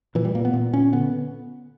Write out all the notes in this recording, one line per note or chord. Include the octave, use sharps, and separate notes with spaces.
A#2 E3
G3
A#2 A#3
B3
A#2
A#2 C#4
D3 B3